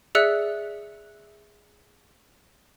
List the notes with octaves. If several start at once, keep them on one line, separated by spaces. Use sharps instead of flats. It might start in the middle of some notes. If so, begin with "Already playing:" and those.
G#4 D5 E5 E6 F#6 C#7